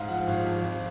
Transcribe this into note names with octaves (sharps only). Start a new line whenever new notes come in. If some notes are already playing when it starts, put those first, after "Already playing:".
Already playing: G#2 F5
F3 F#5
G#1 F5
F2
F2